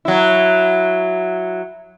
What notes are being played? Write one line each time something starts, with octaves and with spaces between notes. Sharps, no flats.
F#3 E4